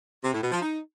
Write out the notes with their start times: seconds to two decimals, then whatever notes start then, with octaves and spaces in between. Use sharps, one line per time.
0.24 C3
0.33 A2
0.43 B2
0.52 F3
0.61 D#4